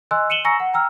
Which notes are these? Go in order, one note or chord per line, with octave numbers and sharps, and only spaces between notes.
D#5 G#5 C6 E6 F#6
C#7 D#7 E7 F#7 G7
G#5 A#5 C#6 E6 A#6 C#7
F#5
G5 A#5 E6 F6